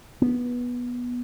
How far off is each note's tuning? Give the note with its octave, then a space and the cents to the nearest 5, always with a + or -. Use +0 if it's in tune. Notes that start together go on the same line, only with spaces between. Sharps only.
B3 -15